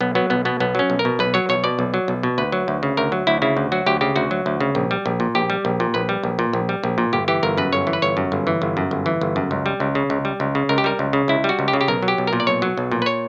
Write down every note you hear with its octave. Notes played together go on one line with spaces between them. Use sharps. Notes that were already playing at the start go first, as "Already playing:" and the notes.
B1 B3
F#3 B3
B1 B3
B2 B3
B1 B3
F#3 C#4
B1
A#4
B2
B1 B4
F#3 C#5
B1 C#5
B2 D5
B1
F#3
B1
B2
D2 B4
F#3
D2
C#3
D2 A#4
F#3
D2 E4
C#3 E4
D2
F#3 F#4
D2 G4
C#3 G4
D2 F#4
F#3
D2
C#3
A#1
G3
A#1
A#2
A#1 G4
G3
A#1
A#2
A#1 B4
G3
A#1
A#2
A#1
G3
A#1
A#2
G1 G4
E3 G4
G1 A#4
F#2 B4
G1 C#5
E3
B4
G1 C#5
F#2
G1
E3
G1
F#2
G1
E3
G1
F#2
C#2
G3
C#2
C#3
C#2
G3
C#2
C#3
C#2 A#4
G4
G3 A#4
C#2
C#3
C#2 E4
G3
F#4
C#2
G4
C#3
G4
B1 A#4
F#3
G4
B1
A#4
A#2
D5
B1 C#5
F#3
B1
A#2
B4
C#5